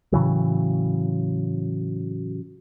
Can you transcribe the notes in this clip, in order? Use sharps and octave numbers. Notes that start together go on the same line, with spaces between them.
A2 C#3 E3 F#3